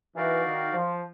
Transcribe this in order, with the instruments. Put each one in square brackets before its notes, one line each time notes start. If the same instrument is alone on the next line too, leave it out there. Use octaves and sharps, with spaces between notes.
[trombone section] E3 [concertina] D#4 F#4 A#4 D5 F5
[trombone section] D#3
F3